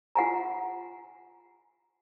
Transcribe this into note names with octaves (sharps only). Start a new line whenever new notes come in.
F4 F#5 G#5 A#5